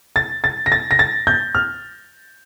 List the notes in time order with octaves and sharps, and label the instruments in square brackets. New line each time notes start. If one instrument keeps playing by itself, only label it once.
[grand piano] A6
A6
A#6
A6
A#6
A6
G6
F6